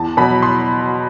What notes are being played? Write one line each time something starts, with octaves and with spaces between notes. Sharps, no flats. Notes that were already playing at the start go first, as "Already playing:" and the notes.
Already playing: E2 A5
B2 F#3 B5
C6